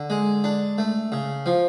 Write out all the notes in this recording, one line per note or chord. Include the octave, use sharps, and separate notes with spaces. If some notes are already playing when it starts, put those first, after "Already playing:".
Already playing: D3
G#3
D4
A3
C#3
F3